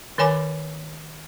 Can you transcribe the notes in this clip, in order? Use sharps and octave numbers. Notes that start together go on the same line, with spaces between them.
D#3 A#4 C#5 G#5 B5 D6